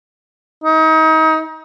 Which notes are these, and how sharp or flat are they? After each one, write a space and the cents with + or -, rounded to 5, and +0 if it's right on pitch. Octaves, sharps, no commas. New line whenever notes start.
D#4 +30